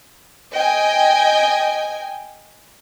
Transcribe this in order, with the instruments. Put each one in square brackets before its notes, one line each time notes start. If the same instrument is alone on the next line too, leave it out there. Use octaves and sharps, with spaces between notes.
[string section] D#5 G5 G#5